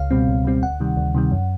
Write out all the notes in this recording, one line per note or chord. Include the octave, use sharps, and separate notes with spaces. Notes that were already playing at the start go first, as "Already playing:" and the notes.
Already playing: C#2 F5
B2 G3 C4
C#2
B2 G3 C4
D2 F#5
C3 D#3 G3
D2
C3 D#3 G3
F#2